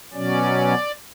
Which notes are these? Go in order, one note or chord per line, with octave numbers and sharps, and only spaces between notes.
B2 F#3 C#4 D5